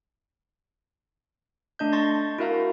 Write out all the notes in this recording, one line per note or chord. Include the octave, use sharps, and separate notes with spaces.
A3 D4 D#5 G6
A5 C6 C#6 A6 A#6
E4 F#4 A#4 E5 F5 A#5